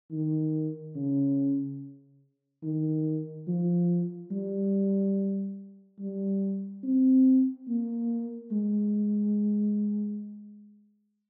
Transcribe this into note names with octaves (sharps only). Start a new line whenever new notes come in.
D#3
C#3
D#3
F3
G3
G3
C4
A#3
G#3